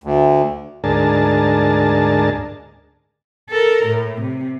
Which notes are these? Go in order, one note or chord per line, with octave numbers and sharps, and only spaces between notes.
D2
D2 G#2 D4 G#4 A#4 A5
A4 A#4
A2
C3